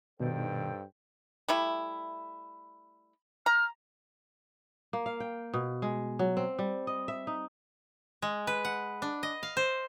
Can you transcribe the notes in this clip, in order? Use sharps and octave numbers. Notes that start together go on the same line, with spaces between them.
G2 B2 D#3 A4 C5 G5
G3 A3 E4
A#5 F6
A#3
F5
G5
B2
G#3
F#3
C4
G3
D#5
E5
D#4
G#3
B4
F#5
D4
D#5
F5
C5